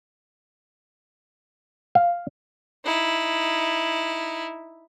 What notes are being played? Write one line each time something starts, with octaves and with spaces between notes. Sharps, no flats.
F5
D#4 E4